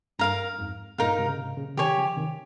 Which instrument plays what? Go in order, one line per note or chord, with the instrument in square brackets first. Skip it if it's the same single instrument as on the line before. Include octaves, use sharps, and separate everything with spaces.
[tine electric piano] G2 [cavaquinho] A#4 F5 A#5
[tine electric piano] F2 G#2
[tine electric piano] G2 A#2 [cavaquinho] D#4 A#4 F5
[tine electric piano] G#2 C3
C#3
G#2 C3
A#2 C#3
C#3
[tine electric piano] C3 D#3 [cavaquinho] G4 C#5 G#5
[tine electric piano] C#3 F3
C3 D#3